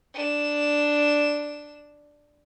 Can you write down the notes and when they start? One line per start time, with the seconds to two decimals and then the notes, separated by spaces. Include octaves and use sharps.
0.14 D4 E7